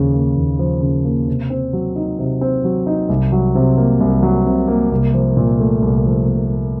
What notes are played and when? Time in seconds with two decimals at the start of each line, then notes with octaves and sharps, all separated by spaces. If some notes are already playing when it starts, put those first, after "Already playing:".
Already playing: D#2 C#3 F3
0.14 A#3
0.36 D#2
0.59 F3
0.82 C#3
1.04 A#3
1.28 C3
1.50 C4
1.73 F#3
1.96 D#4
2.19 C3
2.41 C4
2.64 F#3
2.87 D#4
3.09 C2
3.32 F#3
3.55 C3
3.78 A#3
4.00 C2
4.23 F#3
4.46 C3
4.68 A#3
4.91 C2
5.14 F3
5.37 A#2
5.59 A3
5.82 C2
6.06 F3
6.28 A#2
6.50 A3